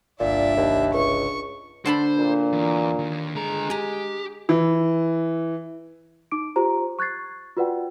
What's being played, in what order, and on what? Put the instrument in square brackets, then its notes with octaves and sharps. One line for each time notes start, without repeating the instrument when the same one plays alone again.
[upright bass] G1 C2 [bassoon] A#2 [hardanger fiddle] D4 E5
[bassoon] D#2
[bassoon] C#2 [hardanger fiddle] C#6
[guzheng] D3 A5 B5 [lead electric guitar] C5
[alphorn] A#2
[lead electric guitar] E2
D#2
[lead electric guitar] D3 A#5 [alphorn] G#3
[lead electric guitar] G4 [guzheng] G#5 A#5
[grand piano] E3
[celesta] D#4 D6 D7
F4 G4 C5 A#5
C#6 F#6 G#6 A6 C7
F4 F#4 B4 D5 F#5 G5